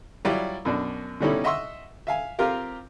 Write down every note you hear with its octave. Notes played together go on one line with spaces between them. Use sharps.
F#3 G3 E4 F4 D5
F#2 B2 D4
B2 D3 G3 C#4 D#4 E4
D#5 E5 F#5 C6 C#6 E6
E5 F5 G#5
C4 F4 G4 A#4 F5